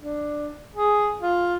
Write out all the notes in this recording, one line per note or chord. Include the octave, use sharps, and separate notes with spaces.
D4
G#4
F4